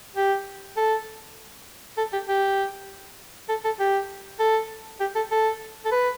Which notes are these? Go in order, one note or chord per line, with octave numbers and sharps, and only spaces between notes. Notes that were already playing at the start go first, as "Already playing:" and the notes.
G4
A4
A4
G4
G4
A4
A4
G4
A4
G4
A4
A4
A4
B4